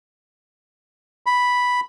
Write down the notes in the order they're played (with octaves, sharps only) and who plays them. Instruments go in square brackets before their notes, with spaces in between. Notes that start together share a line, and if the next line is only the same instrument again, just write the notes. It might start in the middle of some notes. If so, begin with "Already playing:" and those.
[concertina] B5